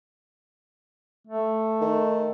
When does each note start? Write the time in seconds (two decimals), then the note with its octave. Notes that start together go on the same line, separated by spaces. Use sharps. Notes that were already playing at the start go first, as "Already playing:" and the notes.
1.27 A3
1.81 D#3